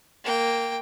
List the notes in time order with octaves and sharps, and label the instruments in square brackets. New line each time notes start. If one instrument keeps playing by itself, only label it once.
[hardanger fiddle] A#3 G5